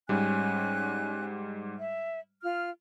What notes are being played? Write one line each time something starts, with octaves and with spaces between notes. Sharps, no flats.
G#2 G3 C#4 G#5 F#6
E5
F4 F6